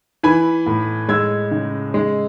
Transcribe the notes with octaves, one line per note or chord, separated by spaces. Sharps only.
E3 G#5 B5
A2
G#3 E6 G#6
C#3
G#3